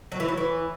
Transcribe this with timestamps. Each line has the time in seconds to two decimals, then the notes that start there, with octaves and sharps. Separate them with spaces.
0.12 F#3
0.20 E3
0.28 F#3
0.37 E3